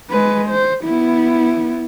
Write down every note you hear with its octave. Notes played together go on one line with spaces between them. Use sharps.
G#3 B4
C5
B3 E4